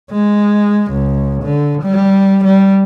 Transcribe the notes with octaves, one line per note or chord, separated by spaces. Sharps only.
G#3
C#2
D3
G3
G3